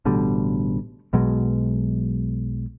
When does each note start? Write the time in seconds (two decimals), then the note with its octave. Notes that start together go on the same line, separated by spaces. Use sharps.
0.05 A1 B2 D3 G3
1.13 B1 B2 F#3 G#3